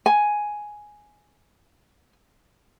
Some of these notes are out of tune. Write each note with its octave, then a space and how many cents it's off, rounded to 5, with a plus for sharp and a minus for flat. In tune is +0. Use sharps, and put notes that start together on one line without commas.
G#5 +5